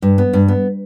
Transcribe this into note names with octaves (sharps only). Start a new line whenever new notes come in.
G2
B3
G2
B3